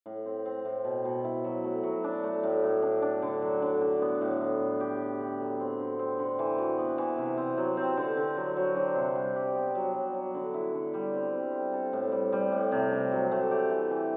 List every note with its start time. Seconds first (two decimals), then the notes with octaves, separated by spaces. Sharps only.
0.06 A2
0.25 C4
0.45 C4
0.65 A2
0.84 B2
1.05 B2
1.24 E4
1.44 F#3
1.64 A3
1.83 F#3
2.04 D4
2.23 A3
2.43 A2
2.63 A2
2.83 D4
3.02 D4
3.22 D3
3.42 F#3
3.62 D3
3.81 D3
4.02 B3
4.21 A2
4.40 A2
4.61 A2
4.80 G4
5.00 G4
5.20 D3
5.40 F#3
5.60 C4
5.79 D3
5.99 C4
6.19 D3
6.39 E3
6.58 F#4
6.78 B3
6.98 E3
7.18 C3
7.37 C4
7.58 F#3
7.77 C4
7.97 D3
8.17 D3
8.37 F#3
8.57 F#3
8.76 D4
8.95 C3
9.16 G3
9.36 G4
9.55 B3
9.75 F#3
9.95 F#3
10.14 F#3
10.34 D3
10.54 E4
10.74 D3
10.94 G3
11.14 C4
11.33 C4
11.53 C4
11.73 A4
11.93 A2
12.12 G3
12.32 G3
12.52 A2
12.72 C3
12.92 D4
13.11 F#3
13.31 A3
13.51 G4
13.70 E3
13.91 E3